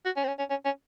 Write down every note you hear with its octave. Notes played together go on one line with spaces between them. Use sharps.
F#4
C#4
C4
C#4
C#4
C#4
C#4